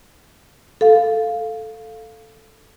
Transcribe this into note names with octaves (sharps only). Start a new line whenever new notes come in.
A4 F5